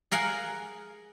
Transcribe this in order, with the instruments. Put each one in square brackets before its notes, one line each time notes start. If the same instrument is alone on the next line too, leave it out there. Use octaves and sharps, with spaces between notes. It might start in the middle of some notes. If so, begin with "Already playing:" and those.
[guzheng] G#4 A#4 F5 F#5 G#5